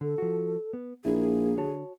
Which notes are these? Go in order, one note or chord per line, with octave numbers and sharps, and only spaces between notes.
D3 A4
F3 F#4
B3
A#1 A#3 E4 G#4
D3 F#4 C#5 A5